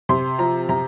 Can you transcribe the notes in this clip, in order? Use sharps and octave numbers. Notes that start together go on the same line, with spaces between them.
C3 C6
F3 A#5
C3 A#5